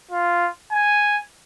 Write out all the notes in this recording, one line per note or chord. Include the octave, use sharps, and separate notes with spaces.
F4
G#5